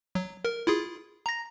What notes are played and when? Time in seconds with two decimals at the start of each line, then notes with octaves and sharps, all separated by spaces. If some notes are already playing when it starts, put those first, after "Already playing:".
0.15 F#3
0.45 A#4
0.67 E4 F4 G#4
1.26 A#5 A#6